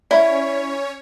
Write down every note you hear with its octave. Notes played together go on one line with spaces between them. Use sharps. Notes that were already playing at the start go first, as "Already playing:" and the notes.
C#4 E4 C#5 D5